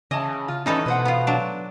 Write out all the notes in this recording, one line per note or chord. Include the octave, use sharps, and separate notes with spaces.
C#3 E3 D#5 A5
F4
D#3 E3 C#4 D#4 A4 B4 C#5
B2 B4 C5 F#5
B3 F4
F#3 D4